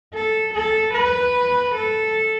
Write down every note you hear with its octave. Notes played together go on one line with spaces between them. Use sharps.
A4
A4
B4
A4